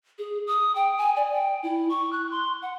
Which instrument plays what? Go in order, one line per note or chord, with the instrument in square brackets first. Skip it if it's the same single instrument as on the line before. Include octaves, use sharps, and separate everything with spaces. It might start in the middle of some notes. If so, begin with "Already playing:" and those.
[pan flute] G#4
D#6
G5
G#5
D5
G5
E4
C#6
F#6
C6
F#5